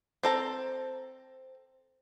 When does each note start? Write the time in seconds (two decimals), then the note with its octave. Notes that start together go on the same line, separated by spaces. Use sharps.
0.23 C4 A4 A#5